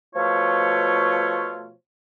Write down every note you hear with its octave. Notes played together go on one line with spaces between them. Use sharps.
B2 F3 A3 F4 C#5